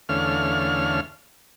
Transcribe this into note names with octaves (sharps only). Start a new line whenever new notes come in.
E2 D3 A3 C#4 F5 F6